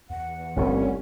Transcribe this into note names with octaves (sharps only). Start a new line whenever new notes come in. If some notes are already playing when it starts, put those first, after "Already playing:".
E2 F#5
G1 C2 A3 B3 C#4